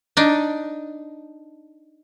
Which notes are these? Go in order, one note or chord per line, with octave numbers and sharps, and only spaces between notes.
D4 D#4